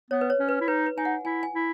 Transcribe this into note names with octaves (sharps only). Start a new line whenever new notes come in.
B3 C#5
B4
C#5
C#4
B4
E4
D#4 B4
B4
D#4 G#5
F#5
E4 G#5
G#5
E4